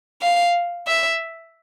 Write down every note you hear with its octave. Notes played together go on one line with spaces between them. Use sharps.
F5
E5